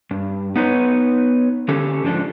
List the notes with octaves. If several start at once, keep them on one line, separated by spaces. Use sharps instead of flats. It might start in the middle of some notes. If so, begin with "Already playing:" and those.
G2
B3 D#4 B4 C#5
D3 C#4 G4 A4
G#2 F3 D4 A4